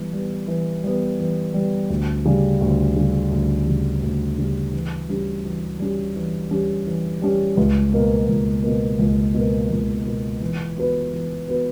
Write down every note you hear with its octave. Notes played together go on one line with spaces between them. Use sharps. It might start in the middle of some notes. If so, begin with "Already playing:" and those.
Already playing: E3 G3 B3
G3 B3
E3
G3 B3
E3
G3 B3
D2
C#3 G3
D2
C#3 G3
D2
C#3 G3
D2
C#3 G3
E3
G3 C#4 G4
E3
G3 C#4 G4
E3
G3 C#4 G4
E3
G3 C#4 G4
C#2
B2 A#3
C#2
B2 A#3
C#2
B2 A#3
C#2
B2 A#3
E3
B3 F#4 B4
E3
B3 F#4 B4